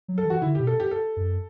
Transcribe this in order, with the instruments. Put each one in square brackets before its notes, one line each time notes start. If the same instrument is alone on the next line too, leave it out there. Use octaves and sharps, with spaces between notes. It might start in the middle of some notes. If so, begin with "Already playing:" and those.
[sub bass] F#3
[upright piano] A4
[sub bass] E3 [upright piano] F#4
[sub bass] D3 [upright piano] E4
[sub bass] B2 [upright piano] G4
[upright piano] A4
G4
A4
[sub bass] F#2